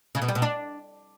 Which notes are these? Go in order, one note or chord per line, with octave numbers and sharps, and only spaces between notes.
C#3
B2
G3
B2
D4